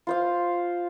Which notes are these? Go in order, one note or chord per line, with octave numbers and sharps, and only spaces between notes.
F4 C5 F5